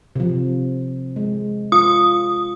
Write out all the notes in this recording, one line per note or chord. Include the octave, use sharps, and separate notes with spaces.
C3 F3
G#3
F4 D#6